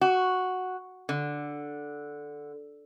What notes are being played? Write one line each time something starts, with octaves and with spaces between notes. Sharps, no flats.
F#4
D3